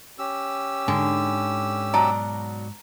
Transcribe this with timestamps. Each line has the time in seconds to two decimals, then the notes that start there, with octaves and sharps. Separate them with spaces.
0.19 C#4 G4 E6
0.88 G#2 D3 G#5
1.94 B2 F#3 D5 A5 A#5